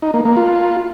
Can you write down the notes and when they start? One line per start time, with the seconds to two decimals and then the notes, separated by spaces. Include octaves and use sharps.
0.02 D#4
0.14 A#3
0.25 A#3
0.37 F4